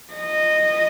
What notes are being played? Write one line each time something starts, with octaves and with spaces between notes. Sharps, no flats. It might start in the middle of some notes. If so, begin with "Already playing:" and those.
D#5